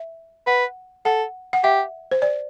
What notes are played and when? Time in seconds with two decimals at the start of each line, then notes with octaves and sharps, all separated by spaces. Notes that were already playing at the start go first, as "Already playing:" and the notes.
Already playing: E5
0.47 B4 F#5
1.05 A4 F#5
1.53 F#5
1.63 G4 E5
2.12 C5
2.22 D5